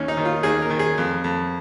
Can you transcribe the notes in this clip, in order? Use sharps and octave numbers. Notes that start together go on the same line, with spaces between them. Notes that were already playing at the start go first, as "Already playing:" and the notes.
Already playing: D#2 C#4
D#4
D#3
F4
D#2 G#4
A#4
D#3
G#4
F2
F2